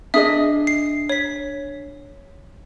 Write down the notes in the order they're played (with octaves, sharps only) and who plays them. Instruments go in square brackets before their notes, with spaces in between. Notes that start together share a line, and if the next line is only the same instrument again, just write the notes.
[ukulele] D4 G#4 D#5 [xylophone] E5 D#6
[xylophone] C7
C#5 B6